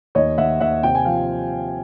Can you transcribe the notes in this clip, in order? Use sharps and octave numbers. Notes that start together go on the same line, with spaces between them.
D#2 C#5 D#5
D#2 E5 F#5
D#2 E5 F#5
C3 G5
G#5
F3 F5 G5